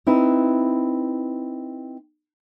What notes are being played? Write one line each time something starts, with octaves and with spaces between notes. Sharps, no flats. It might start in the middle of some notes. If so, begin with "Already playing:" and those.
C4 D#4 E4 B4